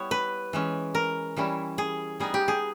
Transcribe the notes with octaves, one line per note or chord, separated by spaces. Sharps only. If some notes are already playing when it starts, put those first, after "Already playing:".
Already playing: G3 B3 E4 C#5
B4
E3 G#3 C#4
A#4
E3 G3 C#4 E4
G#4
G3 B3 D#4 G#4
G4
G#4